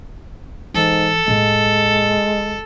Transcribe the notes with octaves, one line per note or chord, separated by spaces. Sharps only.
G#2 E3 A4
A2 G#3 A#3